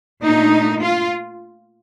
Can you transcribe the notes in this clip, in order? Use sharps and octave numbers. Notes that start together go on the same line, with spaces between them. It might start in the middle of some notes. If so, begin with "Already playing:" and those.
A#2 A3 D4 D#4
F4